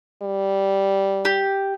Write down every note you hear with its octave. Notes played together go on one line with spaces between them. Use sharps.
G3
G4